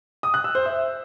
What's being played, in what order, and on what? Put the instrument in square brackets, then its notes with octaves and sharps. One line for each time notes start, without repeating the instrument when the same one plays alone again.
[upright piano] D#6
F#6
E6
C5
E5